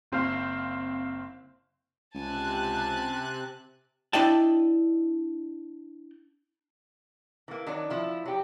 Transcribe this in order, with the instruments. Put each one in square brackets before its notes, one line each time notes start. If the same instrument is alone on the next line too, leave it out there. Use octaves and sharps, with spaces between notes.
[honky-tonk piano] F#1 C4 C5 F5
[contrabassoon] C#2 [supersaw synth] C3 F#6 [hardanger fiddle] G#5 A5
[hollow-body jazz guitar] D4 E4 D5 D#5 G5 A5
[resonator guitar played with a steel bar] E3 A#3
D#3 F#3 D4
F3 E4
F#3 G4